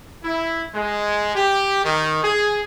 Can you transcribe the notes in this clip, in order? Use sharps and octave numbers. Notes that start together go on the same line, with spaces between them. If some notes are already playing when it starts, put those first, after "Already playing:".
E4
G#3
G4
D#3
G#4